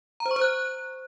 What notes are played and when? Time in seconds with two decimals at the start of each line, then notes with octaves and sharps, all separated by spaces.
0.20 A#5
0.26 C5
0.31 C#6
0.36 C5
0.41 F#6